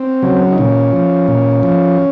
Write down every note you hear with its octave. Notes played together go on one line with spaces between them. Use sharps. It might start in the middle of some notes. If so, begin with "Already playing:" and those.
Already playing: C4
C#3 F#3
D#4
A#2 C#4
F3
A#2
F3